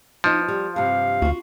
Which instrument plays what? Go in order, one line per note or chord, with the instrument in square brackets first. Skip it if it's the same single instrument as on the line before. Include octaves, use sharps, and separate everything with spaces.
[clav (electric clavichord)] F3 [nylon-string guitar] B3 D#4
[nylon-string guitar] G3
[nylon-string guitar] G2 C3 [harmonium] F5
[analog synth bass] D2 [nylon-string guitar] F4 F#4